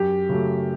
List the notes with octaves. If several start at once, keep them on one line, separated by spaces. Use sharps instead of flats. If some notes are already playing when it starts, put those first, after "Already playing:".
Already playing: F#2 G4
C#3 F#3 A3